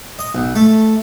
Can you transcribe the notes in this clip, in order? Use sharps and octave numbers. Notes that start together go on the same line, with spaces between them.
D#5
B1
A3